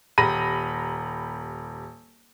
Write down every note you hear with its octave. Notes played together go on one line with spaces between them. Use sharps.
D#1 G4 A#5 B5 A#6 D#7